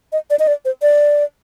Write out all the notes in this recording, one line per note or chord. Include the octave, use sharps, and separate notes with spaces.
D#5
D5
D#5
D5
C5
D5